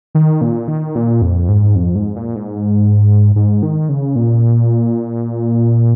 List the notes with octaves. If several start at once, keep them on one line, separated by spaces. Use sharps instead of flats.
D#3
A#2
D#3
A#2
F2
G#2
F2
G#2
A#2
G#2
G#2
D#3
C#3
A#2